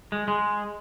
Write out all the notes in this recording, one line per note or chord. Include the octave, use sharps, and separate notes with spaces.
G#3
G#3